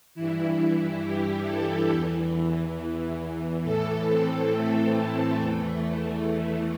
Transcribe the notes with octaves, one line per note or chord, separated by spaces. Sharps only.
G2 E3 E4
G4
A4
E2 E3
A2 E3 A4
C4
A3
A3
E2 E3
A3